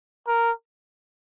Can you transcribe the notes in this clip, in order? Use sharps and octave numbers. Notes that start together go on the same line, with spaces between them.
A#4